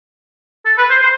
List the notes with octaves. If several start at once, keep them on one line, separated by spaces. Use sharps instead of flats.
A4
B4
C5
C5